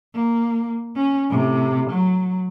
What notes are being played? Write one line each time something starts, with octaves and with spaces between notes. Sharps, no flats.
A#3
C#4
A2 C3
F#3